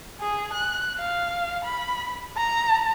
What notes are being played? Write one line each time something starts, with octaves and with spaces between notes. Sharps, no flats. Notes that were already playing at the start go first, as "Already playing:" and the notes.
G#4
F#6
F5
B5
A#5